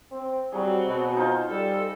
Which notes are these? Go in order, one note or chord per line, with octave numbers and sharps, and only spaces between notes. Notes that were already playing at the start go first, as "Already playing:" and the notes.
C4
F#3 G3 C4 F#4 G#4
B2
D#4 F4 C5
G3 A4